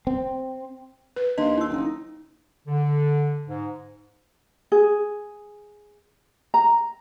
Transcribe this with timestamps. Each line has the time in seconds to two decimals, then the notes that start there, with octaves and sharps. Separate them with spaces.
0.07 C4
1.16 B4
1.38 D#2 D4 D#5 F5 C6
1.57 E4 E6
1.69 F#1 D#4
2.67 D3
3.47 G#2
4.72 G#4
6.54 A#5